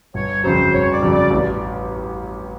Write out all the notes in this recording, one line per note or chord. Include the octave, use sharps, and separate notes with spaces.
G1 C#5
F2 C#3 F#3 C5
G1 C#5
D5
F2 C#3 F#3
D5
A1